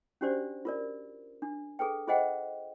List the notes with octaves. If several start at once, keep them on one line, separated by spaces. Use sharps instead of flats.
C#4 D4 F#4 G4 C5 D5
F4 A#4 D5
D4
G#4 A4 B4 G5
F4 G#4 C5 D#5 F#5 G5